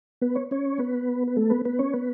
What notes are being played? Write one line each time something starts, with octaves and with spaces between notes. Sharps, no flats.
B3 B4
C#5
C#4 C#5
B3 B4
B4
A3 A4
B3 B4
B3 B4
C#4 C#5
B3 B4